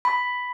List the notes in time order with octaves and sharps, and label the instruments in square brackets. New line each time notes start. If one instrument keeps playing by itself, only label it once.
[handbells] B5